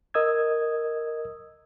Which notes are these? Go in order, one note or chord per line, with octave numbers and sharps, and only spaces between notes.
A#4 D#5 D#6 E6 G#6